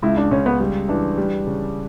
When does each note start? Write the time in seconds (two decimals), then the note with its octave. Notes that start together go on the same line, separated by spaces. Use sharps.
0.02 C#2 E4
0.17 D4
0.31 C#2 C#4
0.46 B3
0.60 G3
0.88 E3 D4
1.18 G3
1.47 C#3